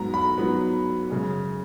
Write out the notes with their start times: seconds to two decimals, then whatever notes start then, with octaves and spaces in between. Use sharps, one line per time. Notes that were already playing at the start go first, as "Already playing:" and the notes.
Already playing: G#2 F#3 B3 A#5
0.14 B5
0.38 G#2 F#3 B3
1.10 F#2 C#3 G#3